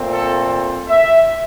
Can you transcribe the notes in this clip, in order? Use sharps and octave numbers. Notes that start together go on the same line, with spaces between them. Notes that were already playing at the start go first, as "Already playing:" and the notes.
Already playing: A#2 A3 C4
A4
E5